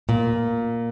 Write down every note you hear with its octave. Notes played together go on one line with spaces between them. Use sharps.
A#2